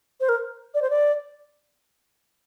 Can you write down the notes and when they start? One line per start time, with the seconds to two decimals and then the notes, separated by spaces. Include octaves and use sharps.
0.21 C5
0.29 A#4
0.74 D5
0.82 C5
0.90 D5